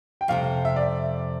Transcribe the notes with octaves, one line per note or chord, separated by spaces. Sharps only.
G5
F2 C3 G3 F5
E5
D5